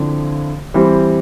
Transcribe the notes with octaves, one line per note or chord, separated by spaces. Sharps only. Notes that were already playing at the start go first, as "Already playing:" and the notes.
Already playing: D3 F3 C4 E4
E3 G3 C4